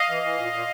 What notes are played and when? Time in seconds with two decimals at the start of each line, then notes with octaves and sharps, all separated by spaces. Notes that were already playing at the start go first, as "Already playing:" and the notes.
Already playing: D#5 F5
0.09 E3
0.23 E3
0.37 A#2
0.52 A#2